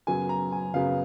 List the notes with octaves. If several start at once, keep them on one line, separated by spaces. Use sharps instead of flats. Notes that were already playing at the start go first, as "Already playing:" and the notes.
F#2 C#3 F#3 B3 G#5
A#5
G#5
F#2 C#3 F#3 B3 F5